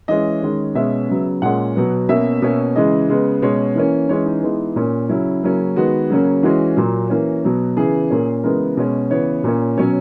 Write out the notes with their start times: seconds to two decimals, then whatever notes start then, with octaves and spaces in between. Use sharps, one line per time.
0.08 E3 G#3 C#4 D#5
0.42 D#3 G#3 C#4
0.75 B2 G#3 C#4 E5
1.09 C#3 F#3 B3
1.42 A#2 G#3 C#4 F#5
1.76 B2 F#3 B3
2.09 B2 A#3 C#4 E5
2.42 B2 A#3 C#4
2.75 C#3 E3 G#3 D#5
3.09 C#3 G#3 B3
3.42 B2 G#3 C#4 C#5
3.75 E3 A#3 C#4
4.09 E3 G#3 C#4 C#5
4.26 D#4
4.43 E3 G#3 B3
4.76 A#2 A#3 C#4
5.09 C#3 F#3 C#4 E4
5.43 C#3 F#3 A#3 C#4
5.76 D#3 G#3 B3 F#4
6.10 C#3 F#3 A#3 C#4
6.43 E3 G#3 C#4 F#4
6.77 A#2 F#3 A#3
7.10 E3 A#3 C#4
7.44 B2 F#3 B3
7.76 C#3 E3 B3 G#4
8.11 A#2 A#3 C#4
8.44 C#3 E3 G#3 B3 A#4
8.77 B2 G#3 C#4
9.10 C#3 E3 B3 C#5
9.44 A#2 A#3 C#4
9.77 B2 F#3 C#4 C#5